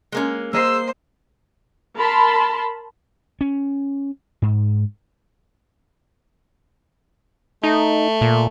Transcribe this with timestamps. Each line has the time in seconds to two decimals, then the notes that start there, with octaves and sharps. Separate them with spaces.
0.12 G#3 A#3 C#4
0.53 A#3 G#4 C5 D#5 E6 C7
1.97 A#4 A5 B5 C6
3.41 C#4
4.42 G#2
7.64 A3 D#4
8.21 A#2